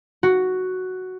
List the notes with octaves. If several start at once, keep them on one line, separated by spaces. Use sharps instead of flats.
F#4